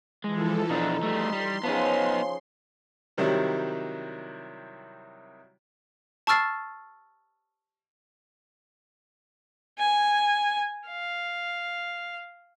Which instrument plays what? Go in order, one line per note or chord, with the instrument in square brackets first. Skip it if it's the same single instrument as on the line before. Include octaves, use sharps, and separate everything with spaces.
[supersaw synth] E3 F3 A4 [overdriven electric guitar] G#3
[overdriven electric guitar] B2 D4 [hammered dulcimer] D#4
[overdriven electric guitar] G3 A3 [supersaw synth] C6
[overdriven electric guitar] G3
[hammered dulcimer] C#3 F3 [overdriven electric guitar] B3 D#4
[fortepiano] C3 D#3 F#3 G3 E4
[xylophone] A5 C#6 E6 F6 A6 C7
[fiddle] G#5
F5